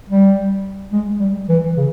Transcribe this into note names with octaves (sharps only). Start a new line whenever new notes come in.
G3
G#3
G3
E3
C#3